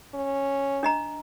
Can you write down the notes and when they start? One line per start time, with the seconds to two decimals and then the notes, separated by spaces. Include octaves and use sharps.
0.14 C#4
0.83 D4 D#5 A#5